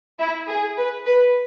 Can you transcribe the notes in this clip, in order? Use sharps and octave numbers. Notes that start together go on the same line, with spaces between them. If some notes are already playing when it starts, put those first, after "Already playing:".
E4
G#4
B4
B4